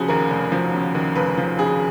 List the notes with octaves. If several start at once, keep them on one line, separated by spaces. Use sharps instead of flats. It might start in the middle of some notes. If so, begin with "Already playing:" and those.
Already playing: F1 C#3 F3 F#4 G#4
D#2 A#4
F1
F3
C#3
D#2
F1 B4
F3
C#3 G#4